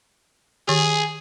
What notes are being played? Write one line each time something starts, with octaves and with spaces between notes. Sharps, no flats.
D#3 G4 G#4